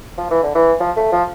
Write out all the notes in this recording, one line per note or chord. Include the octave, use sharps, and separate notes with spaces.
F3
E3
D3
E3
F3
A3
F3